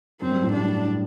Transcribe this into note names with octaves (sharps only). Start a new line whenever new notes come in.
F#2 C4
G2
A2
G2 D4